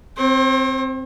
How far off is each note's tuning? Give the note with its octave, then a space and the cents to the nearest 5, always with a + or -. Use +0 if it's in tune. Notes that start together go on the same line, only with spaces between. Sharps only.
C4 +0 C5 +45